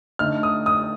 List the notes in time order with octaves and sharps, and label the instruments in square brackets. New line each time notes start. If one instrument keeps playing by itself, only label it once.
[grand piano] D3 A3 D#4 [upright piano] F6
[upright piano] D#6
D#6